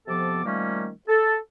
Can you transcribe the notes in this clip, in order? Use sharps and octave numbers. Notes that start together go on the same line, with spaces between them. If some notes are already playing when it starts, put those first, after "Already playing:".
F2 C3 F3 B3 A4 D6
D#3 F3 G3 A3 A#3 C#4
A4